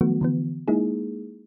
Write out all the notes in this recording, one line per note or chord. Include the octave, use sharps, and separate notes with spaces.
D#3 F3 F#3 A3 B3 F#4
D3 E3 B3
G#3 A#3 D#4 E4 G#4